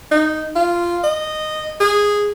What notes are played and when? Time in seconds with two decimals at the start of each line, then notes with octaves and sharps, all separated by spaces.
0.11 D#4
0.56 F4
1.04 D#5
1.80 G#4